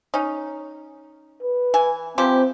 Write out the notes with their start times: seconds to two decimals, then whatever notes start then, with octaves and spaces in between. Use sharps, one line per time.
0.14 C#4 D#4
1.42 B4
1.74 E3 G#5
2.18 E3 F3 C4 G4